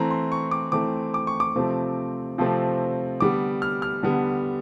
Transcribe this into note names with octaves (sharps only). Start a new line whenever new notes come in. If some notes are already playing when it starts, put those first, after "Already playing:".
Already playing: E3 A3 C4 A#5
C6
C#6
D6
E3 A3 C4 D6
D6
C#6
D6
C3 F3 A3 C4
C3 F3 A3 C4
D3 G3 B3 D6
F6
F6
D3 G3 B3